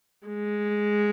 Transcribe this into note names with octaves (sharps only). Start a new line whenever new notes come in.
G#3